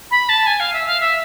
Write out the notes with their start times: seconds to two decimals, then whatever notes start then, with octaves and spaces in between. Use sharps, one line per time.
0.11 B5
0.29 A5
0.46 G#5
0.60 F5
0.73 E5
0.86 F5
1.00 E5